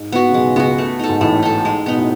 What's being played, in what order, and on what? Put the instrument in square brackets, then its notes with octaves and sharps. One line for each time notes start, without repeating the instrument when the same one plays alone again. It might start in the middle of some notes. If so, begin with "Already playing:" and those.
Already playing: [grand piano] G#2
[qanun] B3 F#4
[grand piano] C#3
[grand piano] B1 B2 [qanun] G#3
[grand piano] C#2 C#3 [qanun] B3 F#4
[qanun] A3
D#4 A4
[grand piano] G#2
[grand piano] A1 A2 [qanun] A3
[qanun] D#4 A4
G#3
[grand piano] B2 [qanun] B3 D#4
[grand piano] A2